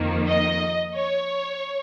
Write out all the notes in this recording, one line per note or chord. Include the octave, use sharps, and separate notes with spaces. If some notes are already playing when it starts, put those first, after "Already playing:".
Already playing: F2 D#3 A#3
D#5
C#5